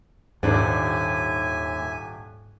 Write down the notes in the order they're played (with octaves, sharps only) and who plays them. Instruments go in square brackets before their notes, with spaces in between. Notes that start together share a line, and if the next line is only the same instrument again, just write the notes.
[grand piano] D#1 D4 [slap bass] D#2 [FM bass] G#2 [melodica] E5 G#5